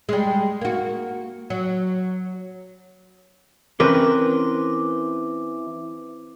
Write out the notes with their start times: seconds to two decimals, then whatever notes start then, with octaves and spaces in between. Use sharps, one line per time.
0.09 G3 G#3
0.61 A#3 F#4
1.50 F#3
3.80 E3 C4 C#4 A#4 B4 D6 F#6